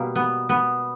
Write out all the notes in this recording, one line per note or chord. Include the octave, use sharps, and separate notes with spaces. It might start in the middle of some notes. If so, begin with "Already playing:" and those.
Already playing: B2 G3 A#3
B3
B3